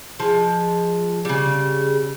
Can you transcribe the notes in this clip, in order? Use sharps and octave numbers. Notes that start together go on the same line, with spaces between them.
F3 G#3
C#3 G3